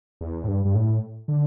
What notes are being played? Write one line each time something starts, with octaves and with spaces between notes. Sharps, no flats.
E2
A2
G2
G2
A2
D3